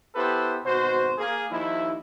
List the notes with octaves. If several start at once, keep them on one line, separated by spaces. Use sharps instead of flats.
B3 E4 G4 A4 B4 C5
G#1 B2 F#4 C5
A#3 G#4
D#2 F3 D#4 E4